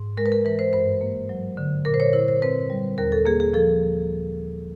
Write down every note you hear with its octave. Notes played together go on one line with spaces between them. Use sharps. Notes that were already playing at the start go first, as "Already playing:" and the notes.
Already playing: G#2
G#3 A#4
B4
A#4
E3 B4
C5
G2 C5
A#3
F#3
D3
A#2 A#4
C5
C#5
E4 C5
C5
C4 B4
G3
D#2 A#4
A4
A#3 G#4
G#4
F3 A4